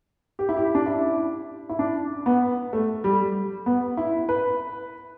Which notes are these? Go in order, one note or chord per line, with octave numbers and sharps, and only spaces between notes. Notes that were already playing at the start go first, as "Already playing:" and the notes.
G4
E4
G4
D4
E4
E4
D4
B3
A3
G3
B3
E4
B4